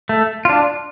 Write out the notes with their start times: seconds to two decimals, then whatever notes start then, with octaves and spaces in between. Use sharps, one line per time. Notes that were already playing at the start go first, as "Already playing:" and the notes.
0.09 A3
0.45 D4 F4